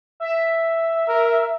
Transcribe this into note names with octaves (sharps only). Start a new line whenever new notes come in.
E5
A#4